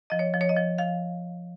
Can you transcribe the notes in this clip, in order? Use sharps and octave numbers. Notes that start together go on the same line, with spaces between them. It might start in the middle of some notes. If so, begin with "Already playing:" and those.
F3 D#5
C#5
F3
C#5
D#5
F3
F3 F5